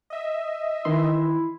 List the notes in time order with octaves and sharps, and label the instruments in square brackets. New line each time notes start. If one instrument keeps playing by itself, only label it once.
[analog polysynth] D#5 E5
[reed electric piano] D#3 E3 C6 [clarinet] E4